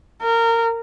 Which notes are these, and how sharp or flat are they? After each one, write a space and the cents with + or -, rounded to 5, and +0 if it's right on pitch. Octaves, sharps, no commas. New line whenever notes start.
A#4 -20